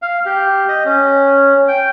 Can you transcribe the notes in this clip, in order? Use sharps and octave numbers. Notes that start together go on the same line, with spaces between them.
F5
G4
D#5
C#4
G5